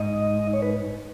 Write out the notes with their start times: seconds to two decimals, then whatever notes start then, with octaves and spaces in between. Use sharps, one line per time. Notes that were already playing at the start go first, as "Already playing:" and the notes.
Already playing: G#2 D#5
0.53 C#5
0.62 B4